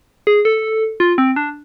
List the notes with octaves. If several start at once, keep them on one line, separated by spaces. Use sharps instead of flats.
G#4
A4
F4
C4
D4